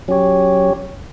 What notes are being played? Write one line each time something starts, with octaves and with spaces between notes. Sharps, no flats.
F#3 C#4 G4 C#5